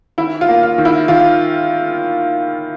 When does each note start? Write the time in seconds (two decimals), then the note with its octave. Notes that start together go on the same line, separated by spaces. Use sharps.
0.18 D#3 E4
0.41 F4
0.49 A#3
0.63 F4
0.78 D#3
0.85 E4
1.08 D#3 F4